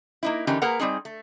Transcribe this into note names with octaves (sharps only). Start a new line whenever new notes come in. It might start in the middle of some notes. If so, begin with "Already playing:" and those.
A#3 D#4 E4
D3 E3 C#4 D#4 G4 A#4
A#3 G#4 A#4 B4 F#5
G3 C4 D#4 G#4
A3